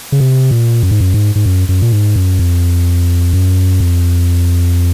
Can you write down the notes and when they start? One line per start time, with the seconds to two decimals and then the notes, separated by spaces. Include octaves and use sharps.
0.12 C#3
0.20 C3
0.51 A#2
0.83 F#2
0.91 G#2
1.00 F#2
1.14 G#2
1.35 G#2
1.46 F#2
1.69 F#2
1.82 A#2
1.92 G#2
2.16 F#2
2.39 F2
3.33 F#2
3.80 F2